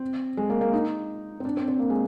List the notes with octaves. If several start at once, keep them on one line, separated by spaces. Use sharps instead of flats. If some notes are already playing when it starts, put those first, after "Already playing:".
Already playing: C4
G#3
A#3
A#3
D#4
C4
D4
C4
C4
A#3
G#3